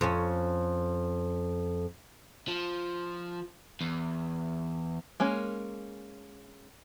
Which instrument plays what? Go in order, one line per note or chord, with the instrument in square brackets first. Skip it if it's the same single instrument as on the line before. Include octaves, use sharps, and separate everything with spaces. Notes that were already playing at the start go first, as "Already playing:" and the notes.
[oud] F2 C#4
[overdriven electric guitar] F3
E2
[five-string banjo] G#3 A#3 C#4